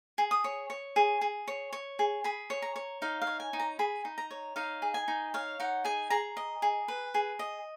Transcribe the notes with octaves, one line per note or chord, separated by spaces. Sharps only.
G#4
D#6
C#5
C#5
G#4
G#4
C#5
C#5
G#4
G#4 B5
C#5
A#5
C#5
D#4 F5
F5
C#5
G#5
D#4
A#5
G#4 B5
D#4
A#5
C#5
D#4 F5
G#4
G#5
D#4
C#5 F5
D#4 F#5
G#4 G#5
G#4 A#5
D#5
G#4
B4
G#4
D#5